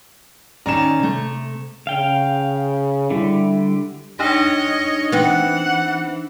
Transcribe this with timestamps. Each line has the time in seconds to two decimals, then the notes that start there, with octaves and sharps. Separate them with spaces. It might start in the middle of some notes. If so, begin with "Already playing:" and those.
0.66 D#3 C#4 D5 A#5 E7
1.00 C3 A3
1.87 C#3 F5 G5
3.11 D3 G3 E4
4.19 D4 D#4 G4 C#5 D#5
5.12 E3 B3 C4 F#5